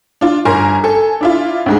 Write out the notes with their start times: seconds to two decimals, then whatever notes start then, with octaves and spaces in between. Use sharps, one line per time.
0.21 D4 F4
0.45 G1 A#4 G#5 A#5 C6
0.84 A4 G#5
1.21 D4 E4 F4
1.66 D2 G#2 G#3